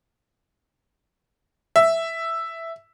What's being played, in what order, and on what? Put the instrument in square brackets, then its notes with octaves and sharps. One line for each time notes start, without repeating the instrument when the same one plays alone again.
[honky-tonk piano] E5